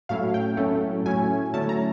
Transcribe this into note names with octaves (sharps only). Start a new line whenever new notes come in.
A2 F#3 A3 C#4 E4 F5
G5
A2 F#3 A3 C#4 E4
A2 F#3 A3 C#4 E4 G#5
D3 F#3 A3 C#4 E4 A5
A#5